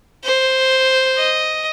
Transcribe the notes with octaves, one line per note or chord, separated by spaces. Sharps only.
C5
D#5